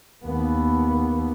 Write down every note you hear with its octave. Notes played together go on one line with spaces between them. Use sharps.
D#2 B3